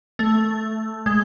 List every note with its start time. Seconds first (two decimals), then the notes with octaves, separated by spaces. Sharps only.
0.19 A3
1.06 G#3